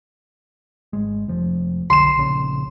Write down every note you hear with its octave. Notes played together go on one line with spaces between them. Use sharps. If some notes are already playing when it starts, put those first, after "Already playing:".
G#1 G#3
F1 F3
B1 D3 C6 E7
A#1 C#3